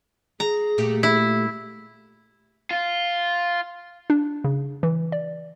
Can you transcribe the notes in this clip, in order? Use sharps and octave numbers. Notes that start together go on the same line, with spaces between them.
G#4 A#5
A#2 A3 G4
E4
F4
D4
C#3
E3
D5